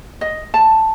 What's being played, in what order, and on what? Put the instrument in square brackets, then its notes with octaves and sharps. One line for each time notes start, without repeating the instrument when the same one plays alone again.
[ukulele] D#5
A5